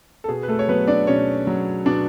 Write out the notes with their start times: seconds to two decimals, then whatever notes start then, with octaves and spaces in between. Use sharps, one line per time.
0.24 A4
0.29 B2 G#4
0.43 B4
0.48 A3 A4
0.59 C#5
0.68 F#3 B3 B4
0.88 D4 D5
1.07 B2 C#4 C#5
1.47 F#3
1.86 B2 D4 D5